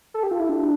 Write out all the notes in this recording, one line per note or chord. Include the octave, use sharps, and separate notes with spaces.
A4
G4
F4
E4
D4